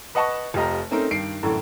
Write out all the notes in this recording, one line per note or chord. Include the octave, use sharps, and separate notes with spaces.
B4 D#5 F#5 A5 C#6
F1 F4 G4 D#5 A#5
A3 C4 C#4 D#4 A#4
G2 D#3 C7 D7
F#2 A2 D3 E3